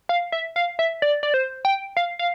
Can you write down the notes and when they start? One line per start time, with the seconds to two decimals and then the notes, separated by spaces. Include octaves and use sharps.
0.09 F5
0.32 E5
0.56 F5
0.79 E5
1.02 D5
1.23 D5
1.34 C5
1.65 G5
1.97 F5
2.19 F5